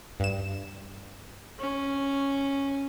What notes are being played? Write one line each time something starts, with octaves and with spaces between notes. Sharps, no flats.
G2 E7
C#4